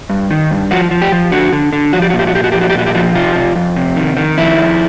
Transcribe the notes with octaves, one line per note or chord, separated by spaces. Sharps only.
G2
D#3
G2
F3 F#4
F3
G4
F3
D3 F#4
D3
D3
F3 F#4
G4
F#4
A#2
G4
F#4
A#2 G4
F#4
F3 G4
F#4
G4
A#2 F#4
G4
F3 F#4
C3 F4
C3
F2
C3
D#3
D#3
F2 E4
F2